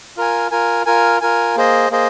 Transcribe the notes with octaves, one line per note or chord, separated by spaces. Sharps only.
F4 A#4 G#5
F4 A#4 G#5
F4 A#4 G#5
F4 A#4 G#5
A#3 G#4 C5 D#5
A#3 G#4 C5 D#5